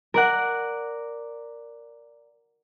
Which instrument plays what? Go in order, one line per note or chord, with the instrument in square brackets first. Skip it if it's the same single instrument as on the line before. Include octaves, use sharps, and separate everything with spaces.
[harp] A#4 D5 F#5